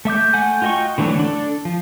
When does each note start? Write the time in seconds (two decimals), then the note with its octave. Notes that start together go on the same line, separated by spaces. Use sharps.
0.05 A3 E5 D6 G6
0.33 A3 F#5 G#5 G6
0.62 F4 F#4 D#5 G5 C#6
0.98 D3 E3 F#3 A3
1.19 D4 A4
1.65 F3